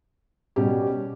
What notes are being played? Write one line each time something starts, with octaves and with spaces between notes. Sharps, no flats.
B2 G3 C#4 G4